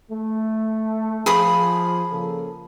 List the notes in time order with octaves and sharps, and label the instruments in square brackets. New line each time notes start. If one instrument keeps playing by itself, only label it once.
[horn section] A3
[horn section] F3 [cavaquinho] G#4 B5 D#6
[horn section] C#3 A#3 A4